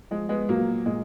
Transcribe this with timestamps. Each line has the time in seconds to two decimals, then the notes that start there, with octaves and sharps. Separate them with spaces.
0.11 F3 G#3
0.29 G#3 B3
0.49 A#2 F#3 A#3
0.86 A#2 G#3